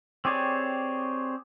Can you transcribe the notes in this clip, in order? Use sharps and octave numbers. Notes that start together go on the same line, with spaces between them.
C4 G4 G#4 C#5 D5